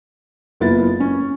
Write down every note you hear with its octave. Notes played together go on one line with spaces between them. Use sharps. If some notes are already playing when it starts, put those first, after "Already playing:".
F#1 A#3 B3 E4 F4 A6
C#4